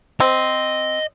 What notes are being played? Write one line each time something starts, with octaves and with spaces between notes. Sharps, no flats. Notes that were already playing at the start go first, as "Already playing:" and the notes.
C4 D#5